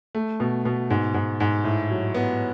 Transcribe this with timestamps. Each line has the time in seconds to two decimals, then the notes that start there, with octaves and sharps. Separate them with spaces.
0.15 A3
0.40 B2
0.65 B2
0.90 G#2
1.14 G#2
1.40 G#2
1.64 A2
1.90 F#3
2.14 B3